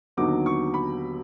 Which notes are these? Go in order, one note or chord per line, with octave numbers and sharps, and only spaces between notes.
D#2 D3 F#3 B3 D#4 D6
C#6
B5